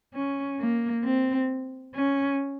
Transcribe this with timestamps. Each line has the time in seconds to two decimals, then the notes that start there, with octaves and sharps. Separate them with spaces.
0.14 C#4
0.60 A#3
1.04 C4
1.95 C#4